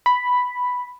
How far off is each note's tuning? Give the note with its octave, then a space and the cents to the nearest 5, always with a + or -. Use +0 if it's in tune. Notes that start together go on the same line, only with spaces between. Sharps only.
B5 +0